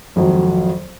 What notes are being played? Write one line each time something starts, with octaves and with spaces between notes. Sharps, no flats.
G#1 F2 F#3